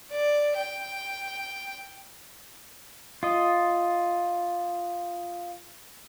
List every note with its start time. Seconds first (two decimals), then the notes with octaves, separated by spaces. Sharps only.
0.11 D5
0.56 G5
3.23 F4 D#5